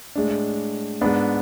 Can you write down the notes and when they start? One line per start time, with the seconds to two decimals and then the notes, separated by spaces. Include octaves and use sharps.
0.15 A2 G#3 D4
1.01 G#2 G#3 B3 D4